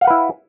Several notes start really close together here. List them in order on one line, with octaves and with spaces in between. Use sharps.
F5 F#5 B4 E4